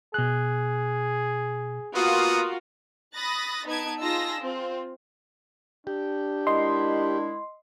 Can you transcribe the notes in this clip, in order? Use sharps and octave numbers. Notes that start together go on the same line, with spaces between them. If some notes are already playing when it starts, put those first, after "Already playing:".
B2 G#4 F#6
A#3 B3 F4 F#4 A#4 D#6
B5 D#6 F#6 A6 A#6
B3 D#4 B4 A5 G#6 D7
D#4 F4 G#4 A5 E6 A#6
C4 F4
D4 G4
D#3 G#3 E4 D#5 C6